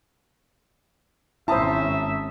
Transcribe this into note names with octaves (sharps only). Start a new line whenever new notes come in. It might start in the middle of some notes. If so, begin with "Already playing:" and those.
G#1 C#4 E4 C5 E5 A5 A#5 D#6